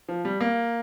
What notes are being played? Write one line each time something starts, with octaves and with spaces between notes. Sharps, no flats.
F3
G3
A#3